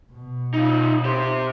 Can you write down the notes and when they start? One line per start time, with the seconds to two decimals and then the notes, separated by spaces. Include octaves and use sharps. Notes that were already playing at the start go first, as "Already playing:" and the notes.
0.12 B2
0.54 D#4 F4
1.05 G4 C5